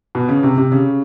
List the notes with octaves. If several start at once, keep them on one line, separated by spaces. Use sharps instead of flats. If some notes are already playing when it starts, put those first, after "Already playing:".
B2
C#3
C3
C3
C#3